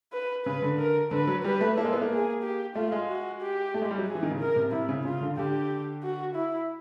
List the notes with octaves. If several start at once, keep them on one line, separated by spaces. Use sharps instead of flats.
B4
C#3 B4
D3
A#4
D3 B4
F#3
G3 B4
A3
A#3 A4
G#3
B3
A#3
G#4
G4
A3 F4
G#3
F#4
G4
A3
G#3
G3
F#3
G#4
E3
D#3
C#3
A#4
C3
C3 E4
C#3
C#3 F4
D3
D3 G4
F#4
E4